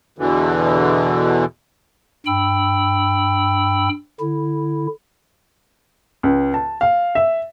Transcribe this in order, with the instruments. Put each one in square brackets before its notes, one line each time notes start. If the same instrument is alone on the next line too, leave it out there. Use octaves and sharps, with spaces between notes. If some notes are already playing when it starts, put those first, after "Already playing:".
[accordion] E2 B2 D3 E3
[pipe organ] G2 G5 B5 E6
D3 E4
[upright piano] C#2
A5
F5
E5